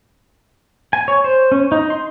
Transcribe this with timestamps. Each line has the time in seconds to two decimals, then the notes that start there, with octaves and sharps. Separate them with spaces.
0.93 G#5
1.08 C#5
1.24 C5
1.52 C#4
1.72 D#4
1.90 C6